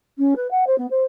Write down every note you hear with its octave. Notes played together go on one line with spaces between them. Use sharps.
C#4
B4
F#5
C5
B3
C5